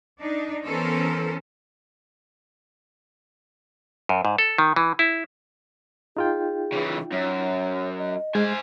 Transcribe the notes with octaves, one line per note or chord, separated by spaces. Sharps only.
D4 D#4
E3 B3 C#4 A4 A#4 C5
F#2
G#2
A4
D#3
E3
E4
D#4 F4 G#4 G5
C#3 E3
F#2 C#5
D#5
G#3 C5 G#5